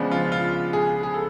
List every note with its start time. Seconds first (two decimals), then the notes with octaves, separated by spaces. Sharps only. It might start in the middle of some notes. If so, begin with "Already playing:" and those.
Already playing: C#3 F3 G#3 B3 D4
0.11 F4
0.32 F4
0.73 G#4
1.03 G#4
1.14 A4